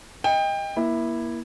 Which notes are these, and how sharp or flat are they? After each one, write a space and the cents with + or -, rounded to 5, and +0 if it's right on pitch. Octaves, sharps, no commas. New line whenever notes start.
D#5 +15 G5 +25
A#3 +30 E4 +0